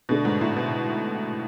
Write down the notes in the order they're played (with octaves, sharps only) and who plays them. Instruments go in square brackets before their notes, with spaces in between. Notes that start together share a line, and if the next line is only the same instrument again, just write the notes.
[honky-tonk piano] B2 [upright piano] D3 A3 D4 A4
[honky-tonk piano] G#2
A2
B2